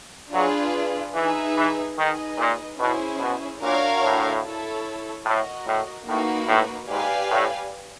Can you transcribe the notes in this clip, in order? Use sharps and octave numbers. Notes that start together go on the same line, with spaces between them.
F#3 D4 F4 G#4 B4
E3 D#4 G#4 B4 E5
E3
D#3 D#4 G#4 B4 D#5
A#2
B2 C#4 E4 G#4 C5
B2
A#2 D4 F#4 A#4 C#5 F5
A2
E4 A4 C#5
A2 F#4 A#4 D#5
A2
A2 A#3 D#4 F#4 B4
A2
G#2 G4 B4 D5 F5 G#5
A2